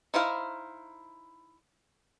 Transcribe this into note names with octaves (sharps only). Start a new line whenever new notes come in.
D#4 E4 C5 F5